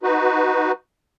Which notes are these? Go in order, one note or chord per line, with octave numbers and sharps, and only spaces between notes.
D#4 F#4 B4